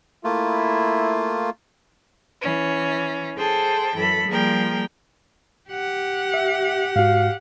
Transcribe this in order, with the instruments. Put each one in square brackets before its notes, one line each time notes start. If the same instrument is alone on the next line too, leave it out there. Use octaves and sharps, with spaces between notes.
[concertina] A3 A#3 F4 [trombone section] E4
[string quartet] E3 C#4
G#4 A4 C5 G5 A5
F#2 E3 A4 B5
F3 G3 A#3 G#4 A#4 G5
[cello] G4 F#5
[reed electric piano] E5
[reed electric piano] G#2 F#4 [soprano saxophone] F5